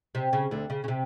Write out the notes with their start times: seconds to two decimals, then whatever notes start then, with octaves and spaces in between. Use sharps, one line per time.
0.15 C3
0.33 C#3
0.51 D2 D3
0.70 C#3
0.84 C#3
0.88 C3